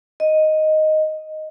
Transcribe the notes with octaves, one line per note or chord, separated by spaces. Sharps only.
D#5